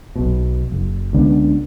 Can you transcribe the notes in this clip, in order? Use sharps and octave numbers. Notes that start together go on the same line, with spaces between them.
B1 B2
F#1
C#2 D3 B3